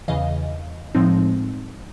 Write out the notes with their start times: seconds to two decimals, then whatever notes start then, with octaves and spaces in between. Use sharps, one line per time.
0.08 E2 C#3 E3 D#5 F5
0.95 A2 F3 G#3 C4 D#4